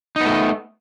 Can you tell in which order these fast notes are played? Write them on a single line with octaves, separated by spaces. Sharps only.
D#4 B3 A3